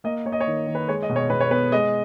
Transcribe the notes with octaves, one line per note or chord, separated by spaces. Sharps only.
A#3 D#5
A#3 C#5
D#5
C#5
D#3
D#3
B4
G#3 C#5
D#5
B2
C#5
B2 B4
C#5
B3 B4
G#3 D#5